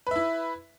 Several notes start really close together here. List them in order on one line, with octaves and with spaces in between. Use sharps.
B4 E5 E4